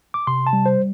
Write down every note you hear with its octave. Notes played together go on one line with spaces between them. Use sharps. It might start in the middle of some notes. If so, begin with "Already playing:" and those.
D6
C3 C6
A5
G3
C5